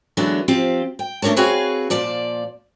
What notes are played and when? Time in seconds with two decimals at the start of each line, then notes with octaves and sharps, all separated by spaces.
0.17 D3 E3 F#3 G#3 B3 D4
0.48 F3 C4 F4 G4
0.99 G5
1.22 A3 D4 A#4 C#5 A5
1.36 C4 F#4 G#4 B4 C#5 F5
1.90 A#2 F3 D5 A5